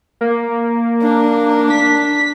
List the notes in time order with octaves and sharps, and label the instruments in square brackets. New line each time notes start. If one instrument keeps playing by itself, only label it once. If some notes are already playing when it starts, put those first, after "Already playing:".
[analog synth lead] A#3
[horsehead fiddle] D4
[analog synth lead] B6